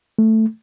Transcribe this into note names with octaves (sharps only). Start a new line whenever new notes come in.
A3